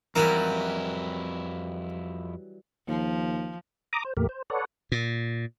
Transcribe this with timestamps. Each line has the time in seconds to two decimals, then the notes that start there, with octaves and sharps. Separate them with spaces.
0.15 F2 E3 F#3 G3 E4 A#4
2.88 D#2 F3
3.93 A#5 D6 D#6
4.05 C5
4.17 E2 A2 A3 A#3 G4 A#4
4.29 C5
4.50 A4 B4 C#5 D5 F#5
4.92 A#2